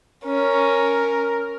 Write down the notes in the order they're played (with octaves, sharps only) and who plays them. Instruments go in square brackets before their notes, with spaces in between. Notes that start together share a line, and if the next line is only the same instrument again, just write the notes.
[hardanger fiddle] C#4 [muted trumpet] A#4